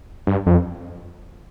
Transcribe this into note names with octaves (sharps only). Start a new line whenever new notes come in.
G2
F2